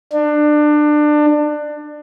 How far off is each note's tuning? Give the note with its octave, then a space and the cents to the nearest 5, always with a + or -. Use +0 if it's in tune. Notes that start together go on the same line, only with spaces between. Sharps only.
D4 +25